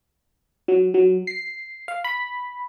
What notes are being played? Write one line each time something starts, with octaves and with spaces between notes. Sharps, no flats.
F#3
F#3
C7
F5
B5